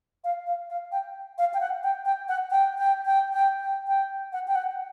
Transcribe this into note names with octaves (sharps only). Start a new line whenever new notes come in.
F5
F5
F5
G5
F5
G5
F#5
G5
G5
F#5
G5
G5
G5
G5
G5
G5
F#5
G5
F#5